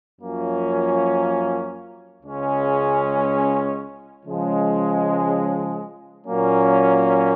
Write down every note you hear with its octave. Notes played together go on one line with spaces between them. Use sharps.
F#2 F3 A#3 C#4 F4
C#2 C#3 G#3 C#4
C#3 F3 G#3 C#4
A#2 F#3 A#3 C#4